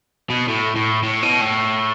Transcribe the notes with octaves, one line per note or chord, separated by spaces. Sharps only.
B2
A2
A2
A2
B2
A2